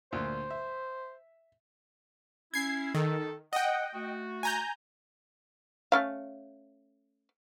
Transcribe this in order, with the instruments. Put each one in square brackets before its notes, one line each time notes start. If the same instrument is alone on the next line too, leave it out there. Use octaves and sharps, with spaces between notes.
[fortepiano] D2 A#2 [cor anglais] C5
[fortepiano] E5
[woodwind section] C#4 E4 [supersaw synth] G#6 C7
[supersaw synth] D#3 [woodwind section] A4
[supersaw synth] D#5 G5 [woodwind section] F#5
[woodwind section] A3 F#4
[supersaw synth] G#5 A#5 G6
[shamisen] A3 C#4 F5